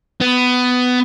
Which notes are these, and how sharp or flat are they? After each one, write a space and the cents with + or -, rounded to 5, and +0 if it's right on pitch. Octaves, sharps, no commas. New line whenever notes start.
B3 +15